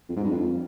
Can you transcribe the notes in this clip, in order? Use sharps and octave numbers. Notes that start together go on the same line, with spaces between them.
F2
G#2
G2
F2